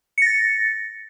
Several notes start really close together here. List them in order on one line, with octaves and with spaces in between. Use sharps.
C#7 A#6 A6